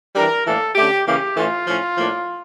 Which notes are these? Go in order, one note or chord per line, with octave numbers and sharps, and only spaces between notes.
E3 G3 D4 A#4
A2 E3 A#3 D4 A4
D3 A3 C#4 G4
C#3 E3 A#3 C#4 G4
A2 E3 A3 C#4 F4
A2 F3 C#4
A2 F3 A#3 D4